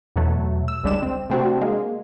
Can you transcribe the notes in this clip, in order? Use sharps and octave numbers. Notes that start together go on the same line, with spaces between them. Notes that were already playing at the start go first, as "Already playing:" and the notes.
E2 B2 F#3 A3
E6
G1 C#2 G3 G#3 D4 E7
C4
C3 A3 C4 D4 F#4
G#3 A#3